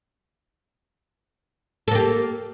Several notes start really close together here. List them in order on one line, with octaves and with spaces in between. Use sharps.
A4 A#3 G4